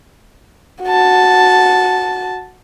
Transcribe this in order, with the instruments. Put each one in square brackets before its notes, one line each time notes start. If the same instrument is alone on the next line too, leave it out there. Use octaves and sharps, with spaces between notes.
[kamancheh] F#4 A5